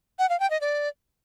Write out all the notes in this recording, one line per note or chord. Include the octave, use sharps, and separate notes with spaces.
F#5
F5
G5
D#5
D5